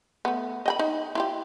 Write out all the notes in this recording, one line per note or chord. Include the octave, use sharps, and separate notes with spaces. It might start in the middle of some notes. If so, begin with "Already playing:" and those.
A3 B3
D#5 G5 B5
D#4
E4 F4 G4